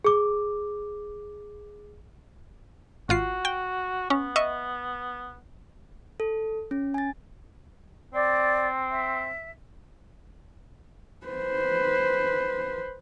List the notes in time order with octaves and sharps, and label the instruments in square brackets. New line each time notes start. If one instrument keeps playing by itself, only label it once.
[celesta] G#4 D6
[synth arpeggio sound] G#1 F4 C7 [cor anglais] F#4
[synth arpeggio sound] G5
[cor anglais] B3 [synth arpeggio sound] C#4
[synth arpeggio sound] D#5 E5 C#6
[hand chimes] A4
C#4
G#5 A6
[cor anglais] C4 [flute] D5
[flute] E5
[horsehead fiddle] B4 C5